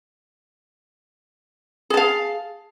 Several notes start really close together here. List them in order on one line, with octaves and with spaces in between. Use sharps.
G#4 A5 F5